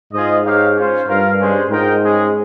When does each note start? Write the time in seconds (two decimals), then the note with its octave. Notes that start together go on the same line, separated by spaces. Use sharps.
0.13 G#2 F4 G#4 C5 D#5
0.45 D#4 G4 C#5 F5
0.76 C#4 F4 C5 F5
1.07 G2 F4 A#4 F5
1.39 G#3 C#4 G#4 C5
1.71 G#2 F4 A#4 D#5 G5
2.03 G#3 C#4 G#4